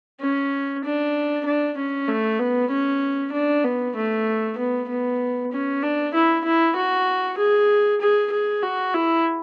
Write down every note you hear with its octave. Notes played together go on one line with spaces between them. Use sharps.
C#4
D4
D4
C#4
A3
B3
C#4
D4
B3
A3
B3
B3
C#4
D4
E4
E4
F#4
G#4
G#4
G#4
F#4
E4